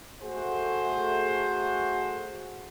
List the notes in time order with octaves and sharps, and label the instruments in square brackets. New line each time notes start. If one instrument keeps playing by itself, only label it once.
[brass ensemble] A3 F#4 G#4 C5